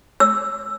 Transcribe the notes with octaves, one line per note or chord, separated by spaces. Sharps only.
E6